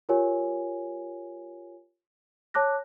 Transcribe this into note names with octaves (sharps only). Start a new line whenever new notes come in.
F4 G4 A#4 C#5 G#5
C#5 A5 D6 F#6 A#6